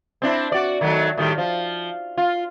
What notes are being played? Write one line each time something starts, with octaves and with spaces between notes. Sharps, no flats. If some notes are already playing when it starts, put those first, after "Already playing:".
C4 D4 E4
F#4 D5
D#3 F#3 A3
A2 D#3 G3
F3
F4